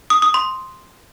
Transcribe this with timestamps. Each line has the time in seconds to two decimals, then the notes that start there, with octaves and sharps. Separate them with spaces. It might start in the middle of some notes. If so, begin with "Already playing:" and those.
0.10 D#6
0.22 D#6
0.34 C6